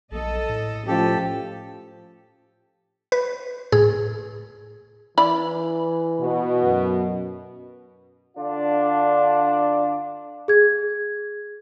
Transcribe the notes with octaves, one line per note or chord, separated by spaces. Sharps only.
A#1 A4 D#5
A2
F3 A3 C#4 G4 A4
B4
A2 G#4
E3 E4 D5 B5
B2
F#2
D3 D4 F4
G#4 G#6